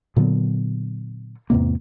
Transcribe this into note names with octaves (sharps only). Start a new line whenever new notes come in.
A#2 D3 F#3 B3
E2 G#2 C3 A#3